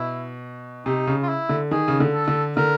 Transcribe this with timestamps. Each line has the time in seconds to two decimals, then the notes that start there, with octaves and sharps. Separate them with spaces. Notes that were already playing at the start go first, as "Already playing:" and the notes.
Already playing: B2 E4
0.86 C3 D#4
1.07 C#3
1.23 F4
1.29 E4
1.49 D3
1.71 D#3 G#4
1.88 C#3
2.00 D3
2.14 A4
2.28 D3
2.57 D3 A#4